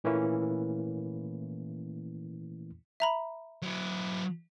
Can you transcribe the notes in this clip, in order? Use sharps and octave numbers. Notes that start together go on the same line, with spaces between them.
A#2 E3 A3 A#3 C#4 E4
E5 A#5 B5
F#3 E4